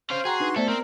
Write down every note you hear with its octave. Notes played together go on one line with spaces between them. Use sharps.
C#4 C5 F5
F#4 G#4 G5 A#5 C6
D4 D#4 B4
A3 B3 A4 C5 D5 E5
C4 A#4